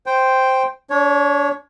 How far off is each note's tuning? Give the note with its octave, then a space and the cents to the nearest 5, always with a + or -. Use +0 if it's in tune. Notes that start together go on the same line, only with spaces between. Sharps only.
C5 +0 G5 +0
D4 -35 C#5 +0